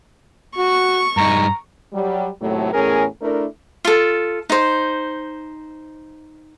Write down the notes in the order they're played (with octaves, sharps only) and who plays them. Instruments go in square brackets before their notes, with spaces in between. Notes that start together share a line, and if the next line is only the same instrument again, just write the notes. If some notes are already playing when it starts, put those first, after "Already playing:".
[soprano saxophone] F#4 [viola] C#6
[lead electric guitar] G2 D#4 [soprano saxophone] A#5
[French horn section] F#3 G3
D#2 A2 C3 F#3 A3
E2 A2 C#4 G#4 A#4
A3 D4 E4 A#4
[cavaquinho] F4 A4
D#4 C5